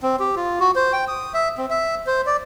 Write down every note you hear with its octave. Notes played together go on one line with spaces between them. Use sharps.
C4
G4
F4
F#4
C5
G5
D#6
E5
C4
E5
C5
D5